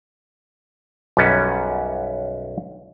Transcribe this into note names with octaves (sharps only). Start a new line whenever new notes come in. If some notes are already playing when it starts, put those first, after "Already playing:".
B1 F#2 G3 B3 C#4